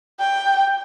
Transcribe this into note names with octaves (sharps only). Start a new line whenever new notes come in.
G5